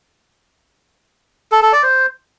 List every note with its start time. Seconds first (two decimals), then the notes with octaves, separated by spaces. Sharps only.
1.52 A4
1.62 A4
1.73 D5
1.83 C5